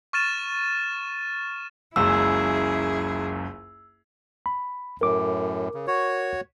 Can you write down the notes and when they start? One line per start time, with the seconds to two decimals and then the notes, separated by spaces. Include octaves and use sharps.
0.13 C#6 F6 A6 D#7 E7
1.96 F#1 C#2 F#2 E4 G#4 E6
4.46 B5
5.01 F#2 A2 A#4 D6
5.74 C#3
5.87 F#4 C#5